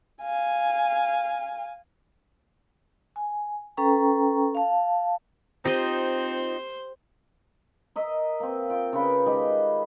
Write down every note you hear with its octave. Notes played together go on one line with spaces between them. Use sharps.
F5 G#5
G#5
C#4 A4 B4 G5 A#5 C#6
F5 A5
C4 D#4 F4 G4 C5 D#5 D#6
A#4 D#5 E5
A#3 C4
F4 G5
C#3 F4 B4
D#3 G#3 G4 D#5